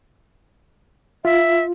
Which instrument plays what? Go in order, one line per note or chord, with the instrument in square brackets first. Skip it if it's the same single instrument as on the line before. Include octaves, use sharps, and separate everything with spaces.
[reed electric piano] F4 [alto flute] E5